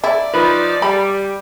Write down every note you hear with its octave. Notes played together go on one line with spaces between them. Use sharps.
E4 D5
F3 D#4 B4
G3 B5